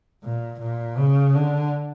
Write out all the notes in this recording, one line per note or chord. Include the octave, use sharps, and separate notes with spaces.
A#2
A#2
C#3
D3